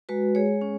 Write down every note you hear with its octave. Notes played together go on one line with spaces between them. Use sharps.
G#3 F#4 B4
G#3 G#4 C#5
C#4